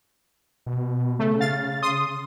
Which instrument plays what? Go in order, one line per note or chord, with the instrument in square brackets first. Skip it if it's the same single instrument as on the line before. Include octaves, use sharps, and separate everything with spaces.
[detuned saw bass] B2
[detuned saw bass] C#3 [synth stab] A3
[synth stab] F5 A6
C6 D#6